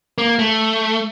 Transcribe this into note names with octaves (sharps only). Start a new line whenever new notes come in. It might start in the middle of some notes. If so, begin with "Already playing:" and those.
A#3
A3